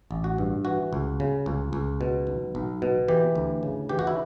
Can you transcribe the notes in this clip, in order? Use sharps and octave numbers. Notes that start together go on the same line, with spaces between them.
A1
F#4
G2
E3 F#4
C#2
C#3
C#2
C#2
B2
B1
B1
B2
E3 G4
D2
C#3
E3 G4
F#4
E4